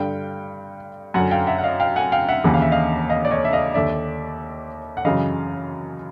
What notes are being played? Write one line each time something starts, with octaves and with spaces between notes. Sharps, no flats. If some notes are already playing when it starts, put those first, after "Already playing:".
Already playing: G2 D3 F5 G5
F#2 D3 F#5 G#5
F5 G5
E5 F#5
F#5
D#5 F5
F5 G5
F#5 G#5
F5 G5
E5 F#5
D#2 C#3 E3 F#5
F5
E5
D#5 F5
D#5 F5
D5
C#5 D#5
E5
D#5 F5
D#2 D3 D5 E5
F#5
F#2 C#3 E3 D#5 F5